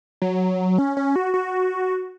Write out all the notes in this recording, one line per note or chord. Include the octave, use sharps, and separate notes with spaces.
F#3
C#4
C#4
F#4
F#4